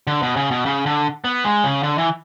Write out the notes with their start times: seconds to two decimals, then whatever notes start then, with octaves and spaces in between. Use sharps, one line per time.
0.07 D3
0.22 B2
0.36 C#3
0.51 B2
0.66 C#3
0.86 D3
1.24 B3
1.44 G#3
1.64 C#3
1.83 D3
1.98 E3